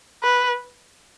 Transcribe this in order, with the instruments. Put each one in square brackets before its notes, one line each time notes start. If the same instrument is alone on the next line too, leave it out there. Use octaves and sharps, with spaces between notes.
[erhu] B4